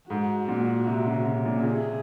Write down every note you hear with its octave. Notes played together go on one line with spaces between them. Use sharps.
G#2 F#4
A#2
C3
C#3
C3
A#2
C#3
C3 G#4